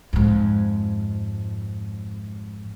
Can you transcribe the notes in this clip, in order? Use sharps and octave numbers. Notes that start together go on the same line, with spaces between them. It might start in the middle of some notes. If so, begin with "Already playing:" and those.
F2 G#2